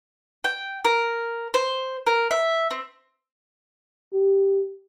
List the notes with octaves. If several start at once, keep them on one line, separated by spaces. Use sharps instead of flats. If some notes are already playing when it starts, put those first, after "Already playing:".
G5
A#4
C5
A#4
E5
C4
G4